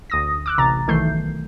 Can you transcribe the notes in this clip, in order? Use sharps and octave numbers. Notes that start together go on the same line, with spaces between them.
D2 D#6 A#6
D6 E6 F#6
A1 C3 A#5 A6
B1 D#3 E3 A3 G6 C7